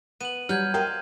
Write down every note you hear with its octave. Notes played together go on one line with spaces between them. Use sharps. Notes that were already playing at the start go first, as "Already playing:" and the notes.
B3 D#7 F#7
F#3 G3 F6 G6 G#6
A#4 C5 D#5 F5 G5